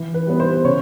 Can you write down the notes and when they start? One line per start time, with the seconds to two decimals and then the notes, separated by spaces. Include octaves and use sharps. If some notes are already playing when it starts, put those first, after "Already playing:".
Already playing: E3
0.14 B4
0.27 G3 B3
0.40 C5
0.65 C#3 C#5